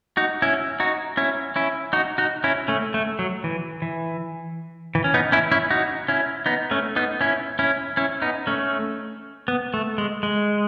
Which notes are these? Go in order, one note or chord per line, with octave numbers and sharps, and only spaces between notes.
D#4 F#4
C#4 E4
D#4 F#4
C#4 E4
C#4 E4
D#4 F#4
D#4 F#4
C#4 E4
A3 C#4
A3
F#3
E3
E3
E3
C#4
B3 D#4
C#4 E4
C#4 E4
D#4 F#4
C#4 E4
B3 D#4
A3 C#4
B3 D#4
C#4 E4
C#4 E4
C#4 E4
B3 D#4
A3 C#4
B3
A3
G#3
G#3